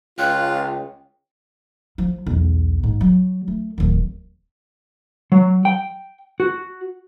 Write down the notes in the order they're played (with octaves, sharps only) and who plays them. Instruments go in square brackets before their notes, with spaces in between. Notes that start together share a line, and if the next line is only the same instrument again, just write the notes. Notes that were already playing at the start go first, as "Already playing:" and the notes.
[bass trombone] C#2 [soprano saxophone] F4 [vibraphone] C#5 G5 [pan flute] F#6
[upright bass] F3
B1 E2
G#2
F#3
A3
D1 D#3
[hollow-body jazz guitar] F#3
G5
F#4